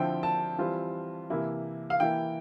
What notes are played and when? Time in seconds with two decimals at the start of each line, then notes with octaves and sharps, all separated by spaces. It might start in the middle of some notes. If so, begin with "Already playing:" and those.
Already playing: D3 F3 C4 E4 G5
0.23 A5
0.58 E3 G3 C4 F4
1.30 C3 E3 A#3 E4
1.90 F5
2.00 E3 A#3 E4 G5